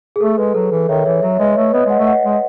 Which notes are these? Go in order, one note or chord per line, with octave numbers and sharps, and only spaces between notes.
G#4
A3 A4
G#3 B4
F#3 A4
E3 A4
D#3 C#5 E5
E3 C#5 E5
F#3 C#5 E5
G#3 B4 D#5
A3 C#5
B3 B4 D#5
G#3 D#5 F#5
A3
D#5 F#5
G#3